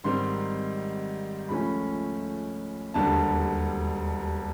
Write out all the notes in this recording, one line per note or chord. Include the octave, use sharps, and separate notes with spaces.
G#1 G#2 D#3 G3 C4 C6
C#2 C#3 F3 A3 C#4 B5
E1 D#2 D3 G3 A5